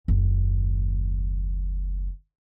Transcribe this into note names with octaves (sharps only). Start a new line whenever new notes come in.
F#1 D#2